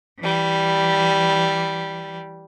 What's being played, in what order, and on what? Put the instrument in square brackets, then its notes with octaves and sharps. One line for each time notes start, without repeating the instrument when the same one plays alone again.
[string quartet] E3 G3